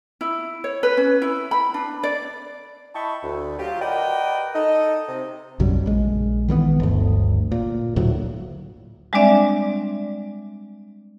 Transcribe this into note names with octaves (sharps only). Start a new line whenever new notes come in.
E4
C#5
B4
C#4
E4
B5
D4
D5
E4 D#5 G5 A5 B5 C#6
D2
F#3 F4 G4
A#4 B4 D5 D#5 F#5 G5
D#4 A4 D#5
C3
B1 F#2 C#3 G3
A#1 G#3
D#3 E3 G3 B3
G1 D2
A#2
D2 A2 F#3 A3
G3 G#3 C4 D4 D5 E5